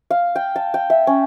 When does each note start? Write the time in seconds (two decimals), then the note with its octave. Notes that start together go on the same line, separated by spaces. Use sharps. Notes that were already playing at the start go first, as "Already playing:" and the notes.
0.11 F5
0.36 G5
0.56 A5
0.74 G5
0.90 E5
1.07 C#4